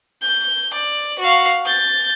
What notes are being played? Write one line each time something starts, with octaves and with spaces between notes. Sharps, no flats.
G6
D5
F#4 F5
G6 A6